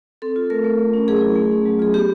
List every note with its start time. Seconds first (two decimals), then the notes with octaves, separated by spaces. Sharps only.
0.22 C4 A4
0.36 F4
0.50 A3 A#4
0.64 A3
0.79 A3
0.93 C#4
1.08 F#3 G#4
1.21 E4
1.36 A3
1.51 C#4
1.65 F#3
1.79 F4 G#4
1.94 B3 G4